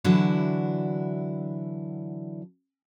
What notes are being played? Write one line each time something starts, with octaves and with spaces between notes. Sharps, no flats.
D3 E3 F#3 D4 E4 F#4